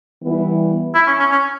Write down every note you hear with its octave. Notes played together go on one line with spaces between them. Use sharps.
E3 G3 B3 E4 B4
E4
C#4
C#4
C#4